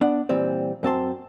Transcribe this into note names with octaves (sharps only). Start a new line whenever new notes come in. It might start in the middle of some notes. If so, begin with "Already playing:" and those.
B3 D4 F#5
A#2 E3 G3 C4
F#2 C4 A5 C6